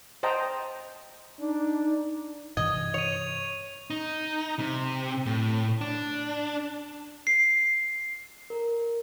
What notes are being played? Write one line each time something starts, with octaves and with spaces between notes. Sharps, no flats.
C5 D#5 G5 A5 A#5
D4 D#4
G2 C3 E3 D#5 G#6
C#5 D#7 F7
D#4
C3
A2
D4
C7
A#4